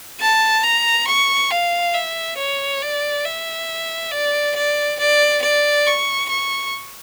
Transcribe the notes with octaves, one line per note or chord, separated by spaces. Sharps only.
A5
A#5
C#6
F5
E5
C#5
D5
E5
D5
D5
D5
D5
C#6
C#6